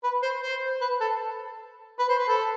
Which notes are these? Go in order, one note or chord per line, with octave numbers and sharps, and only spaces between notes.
B4
C5
C5
B4
A4
B4
C5
B4
A4